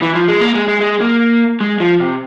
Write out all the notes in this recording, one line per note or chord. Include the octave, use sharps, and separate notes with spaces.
E3
F3
G#3
A#3
G#3
G#3
G#3
A#3
G#3
F3
C3